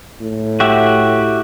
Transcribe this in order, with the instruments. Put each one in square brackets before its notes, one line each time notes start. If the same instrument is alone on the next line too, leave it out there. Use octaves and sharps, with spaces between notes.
[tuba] A2
[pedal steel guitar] F#4 G4 E5